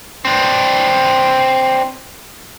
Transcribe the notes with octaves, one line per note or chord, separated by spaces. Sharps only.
C4 D4